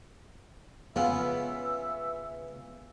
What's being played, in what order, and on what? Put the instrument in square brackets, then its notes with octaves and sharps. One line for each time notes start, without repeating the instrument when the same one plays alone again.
[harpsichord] C#3 E3 F4 [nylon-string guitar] B3 [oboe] E5